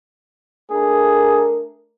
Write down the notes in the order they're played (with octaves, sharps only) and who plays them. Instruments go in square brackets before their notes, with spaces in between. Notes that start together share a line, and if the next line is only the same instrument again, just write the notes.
[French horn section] A3 D4 A#4 [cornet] G#4